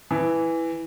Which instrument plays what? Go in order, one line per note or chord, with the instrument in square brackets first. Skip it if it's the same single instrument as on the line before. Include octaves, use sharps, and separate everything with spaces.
[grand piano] E3